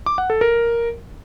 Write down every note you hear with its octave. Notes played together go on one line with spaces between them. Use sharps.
D6
F#5
A4
A#4